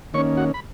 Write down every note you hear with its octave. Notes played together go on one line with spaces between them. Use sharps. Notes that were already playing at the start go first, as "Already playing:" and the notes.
D#3 A#3 C#4 C#5 C#6
F#4 F#5
B5